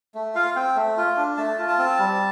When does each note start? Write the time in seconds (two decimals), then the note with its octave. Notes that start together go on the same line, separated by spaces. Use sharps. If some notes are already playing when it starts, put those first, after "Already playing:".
0.15 A3
0.35 F4 F5
0.56 C4 G5
0.76 A3
0.97 F4
1.17 D4
1.37 A3 A5
1.58 F4
1.68 A5
1.79 C4
1.99 G3